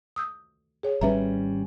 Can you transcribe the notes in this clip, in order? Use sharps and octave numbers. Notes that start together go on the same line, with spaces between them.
D#6 E6 G6
G#4 C#5
G#1 G3 C#4 B4 E5 A#5